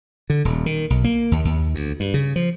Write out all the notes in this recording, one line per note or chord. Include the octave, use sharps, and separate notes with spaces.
D3
D#1
D#3
B1
A#3
D#2
D#2
D2
G2
C#3
F3